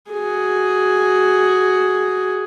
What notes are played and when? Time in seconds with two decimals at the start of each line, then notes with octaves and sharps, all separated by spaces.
0.11 F#4 G#4